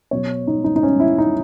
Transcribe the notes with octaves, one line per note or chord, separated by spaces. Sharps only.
B2 F#3 C#5
D#4
D#4
D#4
C#4
E4
D#4